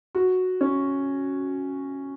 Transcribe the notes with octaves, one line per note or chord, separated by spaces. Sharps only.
F#4
C#4